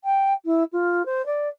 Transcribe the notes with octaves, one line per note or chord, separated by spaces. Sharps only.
G5
E4
F4
C5
D5